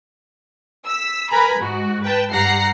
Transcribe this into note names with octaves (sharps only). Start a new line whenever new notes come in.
E6 B6
A#4 B4 G#5 A#5 B5
G#2 F#4
B4 G5 A5
G2 G3 F#5 A#5 A#6 C7